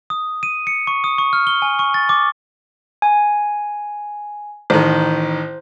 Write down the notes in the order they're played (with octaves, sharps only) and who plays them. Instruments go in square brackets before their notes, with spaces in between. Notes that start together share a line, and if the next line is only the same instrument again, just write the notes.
[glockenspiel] D#6
D#7
C#7
C#6
D#6
C#6
F6
G7
G#5
C#6
A6
D6
[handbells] G#5
[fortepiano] A1 D#3 [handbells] C5